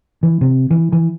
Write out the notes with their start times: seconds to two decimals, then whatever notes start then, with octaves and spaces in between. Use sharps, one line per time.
0.23 E3
0.41 C3
0.71 E3
0.92 E3